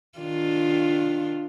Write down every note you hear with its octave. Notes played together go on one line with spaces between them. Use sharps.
D#3 D4 F4